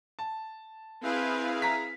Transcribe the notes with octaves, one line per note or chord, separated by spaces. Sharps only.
A5
C4 E4 G#4 B4 F5
A#5 B6